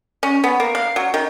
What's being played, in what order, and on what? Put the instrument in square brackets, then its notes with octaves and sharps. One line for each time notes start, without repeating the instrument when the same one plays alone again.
[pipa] C#4
B3
A#3
F5
F#3
D#3